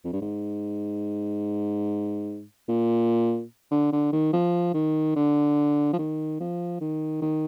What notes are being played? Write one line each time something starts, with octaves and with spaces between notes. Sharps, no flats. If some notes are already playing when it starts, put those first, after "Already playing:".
F2
G2
G#2
A#2
D3
D3
D#3
F3
D#3
D3
F3
D#3
F3
D#3
D#3